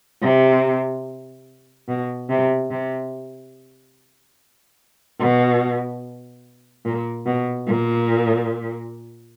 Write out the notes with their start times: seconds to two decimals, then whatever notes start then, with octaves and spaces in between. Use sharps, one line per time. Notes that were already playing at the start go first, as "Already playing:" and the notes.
0.22 C3
1.88 B2
2.29 C3
2.71 C3
5.20 B2
6.85 A#2
7.26 B2
7.67 A#2